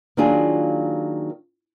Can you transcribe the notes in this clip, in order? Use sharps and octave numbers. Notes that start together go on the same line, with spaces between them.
D#3 F#3 A#3 D4 F4 G#4